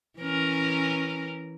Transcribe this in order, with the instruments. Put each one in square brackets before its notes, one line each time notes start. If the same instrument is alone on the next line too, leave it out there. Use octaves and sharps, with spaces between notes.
[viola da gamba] E3 C#4 A#4